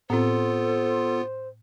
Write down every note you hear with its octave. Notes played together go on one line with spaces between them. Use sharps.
A2 B3 C4 F4 A4 C5